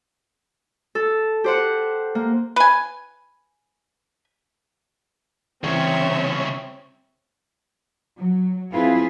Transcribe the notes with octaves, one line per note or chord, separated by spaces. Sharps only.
A4
G4 C5 F#5
A#3
B4 G#5
C2 C#3 E3 C4 C#5 E5
F#3
C4 E4 F4 G#4 B4